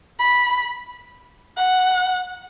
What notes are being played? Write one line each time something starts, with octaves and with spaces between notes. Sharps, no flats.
B5
F#5